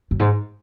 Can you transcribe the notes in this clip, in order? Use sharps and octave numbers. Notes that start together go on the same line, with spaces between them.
F#2
G#2